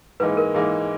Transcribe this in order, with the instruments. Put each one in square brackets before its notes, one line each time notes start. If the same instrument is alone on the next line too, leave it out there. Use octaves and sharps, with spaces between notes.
[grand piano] G#2 E3 A#3 D#4 [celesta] B4
[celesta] A#4
[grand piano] G#2 E3 A#3 D#4 [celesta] G#4